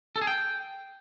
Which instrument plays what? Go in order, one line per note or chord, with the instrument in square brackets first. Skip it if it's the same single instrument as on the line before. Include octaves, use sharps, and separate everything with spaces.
[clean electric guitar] A4
G#4
G5